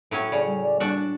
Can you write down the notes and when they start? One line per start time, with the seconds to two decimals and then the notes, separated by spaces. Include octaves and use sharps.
0.11 A2 F#3 C#4
0.32 C#3 D5
0.47 G3
0.61 D5
0.80 G3 D4 F#4